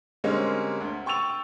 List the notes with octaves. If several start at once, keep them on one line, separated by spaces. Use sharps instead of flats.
D3 G3 G#3 A#3 C4 C#4
D2
G5 C#6 E6 A6 F7